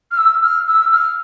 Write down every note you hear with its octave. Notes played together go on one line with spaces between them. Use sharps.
F6
E6
F6
E6
F6